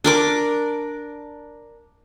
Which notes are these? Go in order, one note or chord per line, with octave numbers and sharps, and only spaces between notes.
D4 A#4 D6